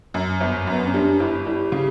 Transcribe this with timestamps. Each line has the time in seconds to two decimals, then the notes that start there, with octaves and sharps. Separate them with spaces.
0.14 F#2
0.40 G1 B3
0.67 F#2 B3
0.88 C#4
0.94 G3 D4
1.20 G1 E4
1.46 G3 E4
1.72 C#3 G4